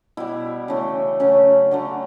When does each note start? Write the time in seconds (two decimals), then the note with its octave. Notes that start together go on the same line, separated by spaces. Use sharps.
0.17 B2 G3 E4
0.68 C#3 E3 A3
1.20 C#3 F#3 A3 C#4
1.71 D3 F#3 A3